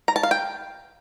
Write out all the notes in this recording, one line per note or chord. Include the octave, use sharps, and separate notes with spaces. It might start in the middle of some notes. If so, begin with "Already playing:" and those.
A#5
A5
F5
G5